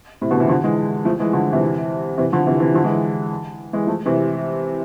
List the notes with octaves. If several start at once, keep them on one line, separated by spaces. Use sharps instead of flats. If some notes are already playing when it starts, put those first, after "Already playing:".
A2 C3
B2 D3
C3 E3
D3 F3
E3 G#3
F3 A3
E3 G#3
D3 F3
C3 E3
C3 E3
D3 F3
C3 E3
C3 E3
D3 F3
E3 G#3
E3 G#3
F3 A3
C3 E3